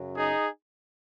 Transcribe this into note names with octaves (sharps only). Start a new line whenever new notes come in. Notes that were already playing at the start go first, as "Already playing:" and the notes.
Already playing: F#2 C#3 F#3
D#4 G#4